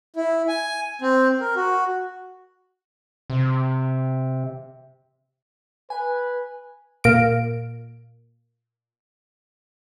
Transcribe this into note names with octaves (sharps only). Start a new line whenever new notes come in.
E4
G#5
C4
A#4
F#4
C3
B4 G#5
A#2 D7